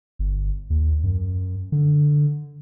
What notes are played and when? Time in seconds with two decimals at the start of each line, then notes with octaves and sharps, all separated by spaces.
0.19 G1
0.70 D#2
1.04 F#2
1.72 D3